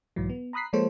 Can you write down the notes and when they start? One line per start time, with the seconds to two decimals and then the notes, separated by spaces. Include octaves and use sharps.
0.16 B1 G#2 E3 F#3
0.30 B3
0.53 A#5 B5 D#6 F#6 B6 C7
0.73 F3 G#3 A#3 A4 C5 C#5